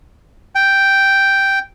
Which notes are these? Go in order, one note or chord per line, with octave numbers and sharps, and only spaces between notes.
G5